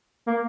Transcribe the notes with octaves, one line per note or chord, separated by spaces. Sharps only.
A#3